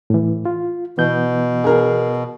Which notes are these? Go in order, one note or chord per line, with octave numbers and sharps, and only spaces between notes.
A2 E3
F4
B2 E3 B3 G6
G#4 A#4